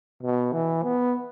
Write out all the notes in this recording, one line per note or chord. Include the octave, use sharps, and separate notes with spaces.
B2
E3
B3